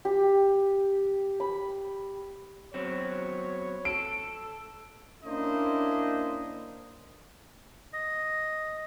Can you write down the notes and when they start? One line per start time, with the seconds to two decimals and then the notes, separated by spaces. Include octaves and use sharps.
0.05 G4
1.40 B5
2.74 F#3 B3 C4 C#5
3.85 A4 D7
5.24 A#3 C#4 D4 E4 C5 D#5
7.93 D#5